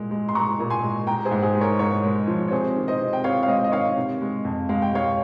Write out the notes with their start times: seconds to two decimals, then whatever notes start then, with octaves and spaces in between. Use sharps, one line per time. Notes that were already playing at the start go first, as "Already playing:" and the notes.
Already playing: A#2 G#3
0.11 G#3
0.29 C6
0.35 G#3 A#5 C#6
0.59 A#2
0.70 G#5 C6
0.83 G#3
1.07 G#3 G5 A#5
1.25 G#4 C5
1.31 G#2
1.43 G#4 C5
1.55 G#3
1.61 A#4 C#5
1.79 G#2 A#4 C#5
2.04 G#3
2.27 F3
2.48 C#5
2.51 C3 G#4 C5
2.76 D#3
2.88 C5 D#5
2.99 C3
3.13 G5
3.24 C3 C#5 F5
3.43 F5
3.48 G#3 C5 D#5
3.64 D#5
3.72 D#3 C#5 F5
3.96 C3
4.21 G#3
4.45 F2
4.69 G#3 F5
4.82 G5
4.93 G#3 C#5 F5